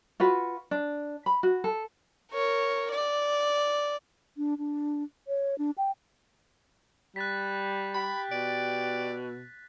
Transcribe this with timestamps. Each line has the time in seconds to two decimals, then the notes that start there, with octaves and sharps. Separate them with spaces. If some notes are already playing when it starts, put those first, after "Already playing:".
0.20 F4 F#4 B4
0.71 D4
1.26 B5
1.43 F#4
1.64 A4
2.32 A#4 C#5
2.91 D5
4.37 D4
4.58 D4
5.28 C#5
5.58 D4
5.78 G5
7.16 G3 F#6 A6 B6
7.94 G4 B5
8.32 B2 D5